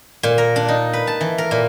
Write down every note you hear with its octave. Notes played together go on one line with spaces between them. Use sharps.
A#2
A#4
D4
D#4
B4
A5
E3
A#4
A#2